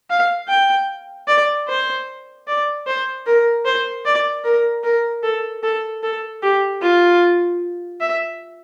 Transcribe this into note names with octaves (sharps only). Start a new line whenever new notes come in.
F5
G5
D5
C5
D5
C5
A#4
C5
D5
A#4
A#4
A4
A4
A4
G4
F4
E5